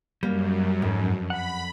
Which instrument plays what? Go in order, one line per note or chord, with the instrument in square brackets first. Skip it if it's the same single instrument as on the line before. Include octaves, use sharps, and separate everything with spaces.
[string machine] F#2 [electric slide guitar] G3 [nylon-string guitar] A#3
[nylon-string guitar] F2 [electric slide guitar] G#2
[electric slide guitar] F#5 [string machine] B5